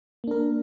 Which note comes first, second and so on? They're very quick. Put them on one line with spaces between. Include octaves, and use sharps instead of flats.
A#3 D4 A#4